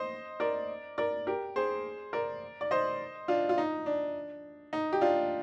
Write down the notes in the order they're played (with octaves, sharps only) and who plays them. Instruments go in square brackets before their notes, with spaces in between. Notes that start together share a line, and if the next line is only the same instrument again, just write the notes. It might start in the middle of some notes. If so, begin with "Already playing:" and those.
Already playing: [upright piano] C5 D#5
A#4 D5
A#4 D5
G4 A#4
G#4 C5
A#4 D5
D5
C5 D#5
D4 F4
F4
D#4
D4
D#4
G4
D4 F4